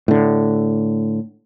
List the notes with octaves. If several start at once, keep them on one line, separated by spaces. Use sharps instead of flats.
A2 D3